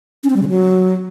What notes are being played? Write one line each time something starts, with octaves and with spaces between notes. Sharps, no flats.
C#4
C4
G3
C#3
F#3